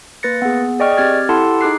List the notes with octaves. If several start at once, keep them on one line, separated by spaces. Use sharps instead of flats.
A#3 B4 A6 A#6 C#7
B3 G#4
G#4 D5 D#5 G5 C#6 F6
C4 G4 F6 G#6 A6
E4 G4 A4 F#5 A5 C6
D#4 G#4 D6 F#6 C7